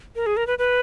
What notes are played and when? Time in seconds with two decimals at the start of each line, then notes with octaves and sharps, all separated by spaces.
0.16 A#4
0.26 G#4
0.37 A#4
0.47 B4
0.59 B4